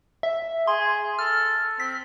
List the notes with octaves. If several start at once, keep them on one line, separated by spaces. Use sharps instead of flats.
E5
G#4 C6
A4 F6
C4 B6